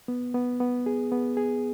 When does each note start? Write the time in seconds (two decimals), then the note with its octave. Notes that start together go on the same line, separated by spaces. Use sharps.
0.08 B3
0.34 B3
0.60 B3
0.86 G#4
1.12 B3
1.37 G#4